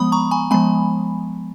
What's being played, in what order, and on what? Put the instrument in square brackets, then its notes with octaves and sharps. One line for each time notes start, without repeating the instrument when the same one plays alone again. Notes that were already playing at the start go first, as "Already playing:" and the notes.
Already playing: [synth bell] F3 G#3 B3 B5 D#6
A#5 C#6
G#5 B5
F3 G#3 B3 G#5 B5